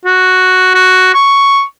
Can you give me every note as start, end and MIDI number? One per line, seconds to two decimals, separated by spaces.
0.05 0.72 66
0.75 1.14 66
1.14 1.62 85